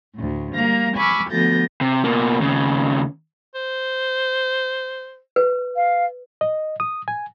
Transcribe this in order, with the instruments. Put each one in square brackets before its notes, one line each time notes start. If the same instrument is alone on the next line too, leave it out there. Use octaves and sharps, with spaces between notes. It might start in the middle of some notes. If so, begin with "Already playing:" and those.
[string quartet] D2 A2
G3 A#3 F5 A#5
G#5 B5 C#6 D6 E6 F6
D2 F3 B3 G6 A6 A#6
[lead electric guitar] C3
B2 A#3
D#2 C#3
[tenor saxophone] C5
[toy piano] B4
[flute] F5
[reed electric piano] D#5
D#6
G#5